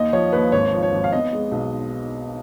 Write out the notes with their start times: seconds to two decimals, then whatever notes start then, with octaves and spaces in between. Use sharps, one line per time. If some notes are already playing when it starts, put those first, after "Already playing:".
Already playing: D#2 D#5
0.13 F3 C#5
0.33 D#2 B4
0.52 G#1 C#5
0.73 F3
0.82 C#5
0.92 G#1
1.04 F5
1.12 B3 D#5
1.33 G#3
1.52 B1